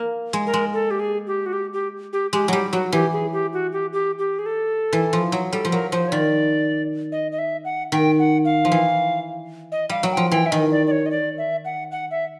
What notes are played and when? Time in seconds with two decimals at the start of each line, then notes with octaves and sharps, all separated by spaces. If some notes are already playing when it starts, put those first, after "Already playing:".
Already playing: A#3
0.33 G#3
0.46 A#4
0.54 G#3
0.73 A4
0.91 G4
1.00 G#4
1.27 G4
1.46 F#4
1.53 G4
1.73 G4
2.13 G4
2.33 G#3 G4
2.48 F#3 G3 G4
2.73 F#3 F#4
2.92 E3 G4
3.12 G#4
3.33 G4
3.53 F#4
3.72 G4
3.93 G4
4.19 G4
4.39 G#4
4.46 A4
4.93 E3
5.13 F3
5.32 F#3
5.53 G3 A4
5.65 F3
5.72 F#3 A#4
5.92 F3 C5
6.08 C#5
6.12 D#3 D5
7.12 D#5
7.32 D#5
7.38 E5
7.65 F#5
7.92 D#3 G5
8.19 F#5
8.45 F5
8.65 F3
8.72 E3
9.72 D#5
9.89 G3 F5
10.03 F#3
10.12 G5
10.17 F3
10.31 E3 G5
10.46 E5
10.51 D#3 D#5
10.71 D5
10.87 D5
10.91 C#5
11.06 D#5
11.11 D5
11.38 E5
11.65 F#5
11.92 F#5
12.11 E5